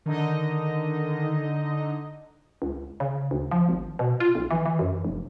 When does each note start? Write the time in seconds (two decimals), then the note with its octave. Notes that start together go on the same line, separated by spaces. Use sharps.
0.06 D3 D#3 D#4 D#5
2.62 C#2
3.00 C#3
3.31 D2
3.51 F3
3.69 G#1
3.99 B2
4.20 F4
4.35 B1
4.51 E3
4.66 E3
4.79 F#2
5.05 F1